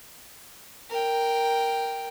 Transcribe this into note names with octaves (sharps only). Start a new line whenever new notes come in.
A#4 G5